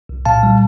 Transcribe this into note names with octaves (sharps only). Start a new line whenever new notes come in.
C2
A#2 F5 A5
G3